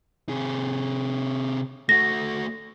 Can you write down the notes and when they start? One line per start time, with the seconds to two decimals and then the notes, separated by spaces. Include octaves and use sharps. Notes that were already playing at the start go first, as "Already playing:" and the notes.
0.29 C3 G#4
1.89 A3 F#4 A#6